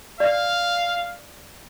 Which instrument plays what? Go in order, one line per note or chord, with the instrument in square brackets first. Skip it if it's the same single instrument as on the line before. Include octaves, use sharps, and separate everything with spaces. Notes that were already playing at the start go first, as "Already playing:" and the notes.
[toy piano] D5 [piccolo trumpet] F5